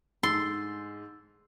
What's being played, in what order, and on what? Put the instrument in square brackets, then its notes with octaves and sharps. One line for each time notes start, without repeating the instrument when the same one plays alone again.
[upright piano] G#2 [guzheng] C6 [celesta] E6 A6